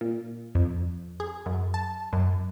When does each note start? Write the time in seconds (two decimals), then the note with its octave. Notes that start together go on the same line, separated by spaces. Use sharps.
0.01 A#2
0.55 F2
1.20 G#4
1.46 F#2
1.74 A5
2.13 F#2